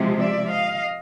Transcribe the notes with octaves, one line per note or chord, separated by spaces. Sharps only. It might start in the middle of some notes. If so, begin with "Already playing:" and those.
Already playing: C3 F3 G#3
D5 E5
D#5 F5